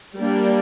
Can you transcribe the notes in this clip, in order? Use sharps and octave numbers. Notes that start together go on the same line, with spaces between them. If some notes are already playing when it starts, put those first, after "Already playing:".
G3 A#3 D4